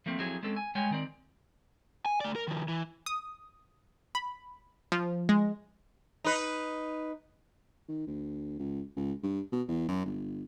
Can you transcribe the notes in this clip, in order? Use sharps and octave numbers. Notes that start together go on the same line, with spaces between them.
F3 A3 A#3 C4
F3 F#3 C4 E4 G#4 A4
G#3 C4 C#4 A4
G#5
G3 G#3 C#5 G5 G#5
D#3 C4 D5
G#5
A3 D5
A#4
D#3 F3
E3
D#6
B5
F3
G#3
D#4 B4
D#3
D2
C#2
C#2
G2
B2
E2
F#2
G1